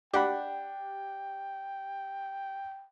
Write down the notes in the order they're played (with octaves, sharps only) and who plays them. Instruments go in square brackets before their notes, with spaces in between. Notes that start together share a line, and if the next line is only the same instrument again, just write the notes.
[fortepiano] D4 F#5 B5 [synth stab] G4 [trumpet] G5